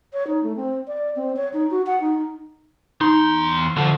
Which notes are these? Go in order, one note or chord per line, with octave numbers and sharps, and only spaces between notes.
C#5
D#4
A3
C4
D5
C4
C#5
D#4
F#4
F#5
D#4
E2 D#4 C6
C2 D3 F3